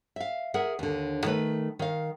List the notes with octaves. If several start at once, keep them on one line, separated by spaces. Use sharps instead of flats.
E5 F5
G#4 A#4 E5 F#5
D#2 D3
D#3 A3 B4
D#3 F5